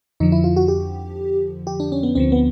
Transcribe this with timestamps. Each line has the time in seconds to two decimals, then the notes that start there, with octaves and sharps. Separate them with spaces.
0.20 F2 D3 F3 D#4
0.32 E4
0.44 F4
0.56 F#4
0.68 G4
1.67 G4
1.80 D4
1.92 C#4
2.03 B3
2.15 D2 D3 F3 C4
2.32 B3